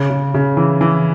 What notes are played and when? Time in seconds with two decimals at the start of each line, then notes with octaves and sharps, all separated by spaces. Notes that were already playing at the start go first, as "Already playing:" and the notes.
Already playing: C#3
0.10 C#3
0.34 C#3
0.57 E3
0.81 E3